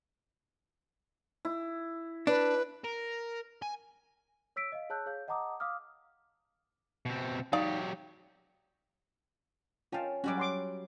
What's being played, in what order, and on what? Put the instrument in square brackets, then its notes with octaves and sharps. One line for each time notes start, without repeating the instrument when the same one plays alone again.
[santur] E4
[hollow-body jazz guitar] D4 [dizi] B4
[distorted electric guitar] A#4
G#5
[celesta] C#5 E6 B6 D7
D#5 F5
G#4 C#5 A5 E6 F#6 G6
G#4 C#5 F5 G6
D#5 F#5 A5 A#5 D6 D#6
F5 D6 D#6 F6
[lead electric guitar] B2 C4
[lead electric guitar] F#3 G4 [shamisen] D#4 D5 F5
[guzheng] C#4 F5 [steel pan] F4 G5 A5
[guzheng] F#3 G3 F#4 [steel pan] C#4 D6
[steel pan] F#5 C6 D6